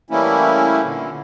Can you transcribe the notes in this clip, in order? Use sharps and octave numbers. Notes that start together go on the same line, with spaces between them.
E3 G3 A3 A#3 C#4 E4
A#2 D3